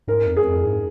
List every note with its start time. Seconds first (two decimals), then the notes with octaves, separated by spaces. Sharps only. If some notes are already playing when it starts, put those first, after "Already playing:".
0.07 G#2 A#4
0.27 F2
0.37 F#2 G#4
0.45 F2
0.65 G#2